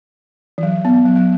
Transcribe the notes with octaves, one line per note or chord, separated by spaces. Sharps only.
E3
F#3
B3
F#3
F#3